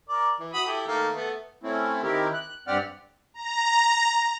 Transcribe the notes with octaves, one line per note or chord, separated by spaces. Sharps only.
A#4 D5
E3
F#4 B5 D#6
E4 G4 A4
D#3 A3 A#3
A3 B3
A3 C4 C#4 E4
D#3 C4 E4 G4 A#4
F#6
G2 C4 G4 D5 F#5 F6
A#5